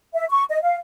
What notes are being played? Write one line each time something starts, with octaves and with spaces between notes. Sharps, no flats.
E5
C#6
D#5
F5